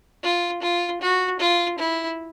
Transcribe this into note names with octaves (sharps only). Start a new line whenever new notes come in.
F4
F4
F#4
F4
E4